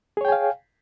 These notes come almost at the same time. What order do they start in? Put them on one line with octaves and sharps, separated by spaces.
G#4 C#5 G5 G#5 F5